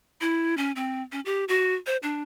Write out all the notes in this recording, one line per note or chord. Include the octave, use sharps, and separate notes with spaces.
E4
C#4
C4
C#4
G4
F#4
C5
D4